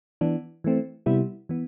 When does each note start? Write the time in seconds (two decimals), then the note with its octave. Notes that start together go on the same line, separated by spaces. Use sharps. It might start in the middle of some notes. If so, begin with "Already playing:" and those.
0.21 E3 B3 D4
0.64 E3 A3 C4
1.06 C3 G3 B3 E4
1.49 E3 B3